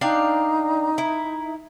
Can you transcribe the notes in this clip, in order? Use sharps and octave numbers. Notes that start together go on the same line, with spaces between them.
D4 D#4 F5 G5 A#5
E4